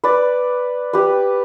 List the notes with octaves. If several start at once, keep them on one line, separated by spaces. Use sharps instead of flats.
B4 D5
G4 B4